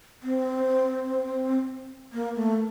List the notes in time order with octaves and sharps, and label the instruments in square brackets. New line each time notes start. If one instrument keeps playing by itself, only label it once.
[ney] C4
A#3
A3